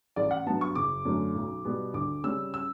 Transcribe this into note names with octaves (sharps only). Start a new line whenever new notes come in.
A1 D5
F#5
G2 F#3 B3 A5
C#6
F#1 D6
F#2 D3 A3 C#4
B1
B2 G3 B3
D2 D6
C#3 G3 C#4 E6
E6